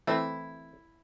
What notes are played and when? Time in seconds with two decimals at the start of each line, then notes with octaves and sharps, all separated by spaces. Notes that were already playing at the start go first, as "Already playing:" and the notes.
0.07 E3 A3 C4 E4